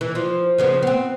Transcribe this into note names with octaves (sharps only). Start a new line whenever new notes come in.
E3
F3
C#3 F3 B3
B3 C4